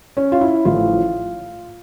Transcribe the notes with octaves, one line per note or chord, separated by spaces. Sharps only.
C#4
F4
E4
A1 A2 F3 A3 F4